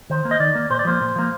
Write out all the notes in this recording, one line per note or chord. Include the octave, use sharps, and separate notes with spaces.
D#3 C5
A#3
D#5
D#3 D5
A#3
A#2 C5
D5
F3 A#3 C5
A#2
F3 A#3